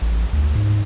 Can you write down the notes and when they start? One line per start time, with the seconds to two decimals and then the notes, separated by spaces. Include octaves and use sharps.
0.02 A1
0.33 D2
0.55 G#2